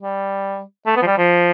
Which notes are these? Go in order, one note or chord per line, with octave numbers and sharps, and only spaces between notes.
G3
A3
B3
F3
G3
F3